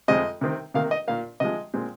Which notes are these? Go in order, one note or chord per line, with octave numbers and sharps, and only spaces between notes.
F2 C3 G#3 C4 D#5
C3 D#3 C4
C3 D#3 A#3 F5
D#5
A#2 A#3 F5
C3 F3 G#3 D#5
A#2 G#3 C4